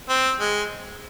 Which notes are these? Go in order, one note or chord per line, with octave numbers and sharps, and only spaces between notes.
C4
G#3